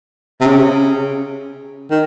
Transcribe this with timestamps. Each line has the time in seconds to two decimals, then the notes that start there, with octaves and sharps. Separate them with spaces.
0.41 C3
0.46 C#3
1.91 D#3